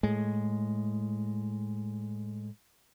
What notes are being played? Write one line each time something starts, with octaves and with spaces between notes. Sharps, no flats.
A2 G#3